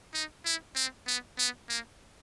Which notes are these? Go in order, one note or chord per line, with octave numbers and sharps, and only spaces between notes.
D#4
E4
C4
B3
B3
A#3